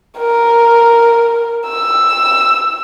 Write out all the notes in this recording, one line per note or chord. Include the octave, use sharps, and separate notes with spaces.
A#4
E6